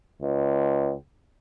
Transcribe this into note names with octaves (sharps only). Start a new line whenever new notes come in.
C#2